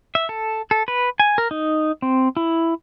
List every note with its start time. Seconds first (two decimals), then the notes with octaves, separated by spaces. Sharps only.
0.15 E5
0.29 A4
0.71 A4
0.88 B4
1.20 G#5
1.38 A#4
1.51 D#4
2.02 C4
2.37 E4